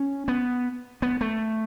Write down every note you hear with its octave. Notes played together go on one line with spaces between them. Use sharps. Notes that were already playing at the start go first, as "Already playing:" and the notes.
Already playing: C#4
B3
B3
A3